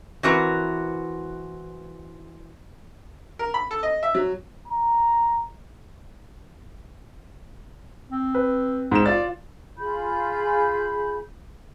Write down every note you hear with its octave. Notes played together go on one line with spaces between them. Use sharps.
E3 C4 F#4 A#4 B4
A#4
B5
A4
D#5
E5
F#3
A#5
C4
B4
G#2 E7
F4 D5 A6
F4 G#4 B5 G6